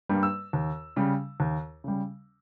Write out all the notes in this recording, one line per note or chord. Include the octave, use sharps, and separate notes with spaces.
G2 G3 A#3
E6
D#2
C#3 G3
D#2
C#3 G3